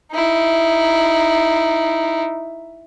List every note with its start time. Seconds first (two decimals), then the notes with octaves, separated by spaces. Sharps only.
0.13 D#4 E4